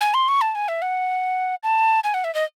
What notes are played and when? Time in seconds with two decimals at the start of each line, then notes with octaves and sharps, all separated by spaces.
0.01 G#5
0.14 C6
0.28 C#6
0.41 A5
0.55 G#5
0.68 E5
0.82 F#5
1.63 A5
2.04 G#5
2.14 F#5
2.24 E5
2.35 D#5